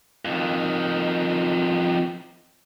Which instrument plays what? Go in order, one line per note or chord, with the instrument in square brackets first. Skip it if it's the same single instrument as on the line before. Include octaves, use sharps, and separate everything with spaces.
[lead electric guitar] F2 D#3